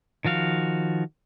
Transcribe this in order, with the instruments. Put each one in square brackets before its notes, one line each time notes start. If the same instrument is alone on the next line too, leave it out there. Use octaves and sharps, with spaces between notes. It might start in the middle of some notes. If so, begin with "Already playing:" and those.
[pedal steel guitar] D#3 F3 F#4 F5